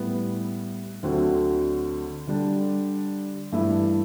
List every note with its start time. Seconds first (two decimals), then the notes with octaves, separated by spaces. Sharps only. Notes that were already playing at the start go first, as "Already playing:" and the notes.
Already playing: A2 G3 B3
1.03 D2 D3 F#3 C4 F#4
2.27 D3 G3 D4
3.52 G2 E3 A3 E4